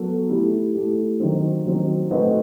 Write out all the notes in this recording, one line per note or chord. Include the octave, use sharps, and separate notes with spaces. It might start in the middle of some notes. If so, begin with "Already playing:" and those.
Already playing: F#3 B3 F#4 A4
A3 E4 G4
A3 E4 G4
D#3 F#3 C4
D#3 F#3 C4
A3 C4 F#4 B4 D#5